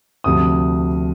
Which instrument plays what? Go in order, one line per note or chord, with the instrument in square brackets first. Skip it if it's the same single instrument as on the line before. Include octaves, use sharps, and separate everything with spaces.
[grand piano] D2 C3 F3 D#6